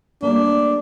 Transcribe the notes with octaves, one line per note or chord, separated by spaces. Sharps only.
G3 A3 A#3 D4